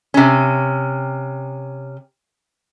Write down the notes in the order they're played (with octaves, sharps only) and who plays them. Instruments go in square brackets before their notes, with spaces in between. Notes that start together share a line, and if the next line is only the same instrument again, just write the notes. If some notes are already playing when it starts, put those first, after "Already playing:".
[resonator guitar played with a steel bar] C3 C#4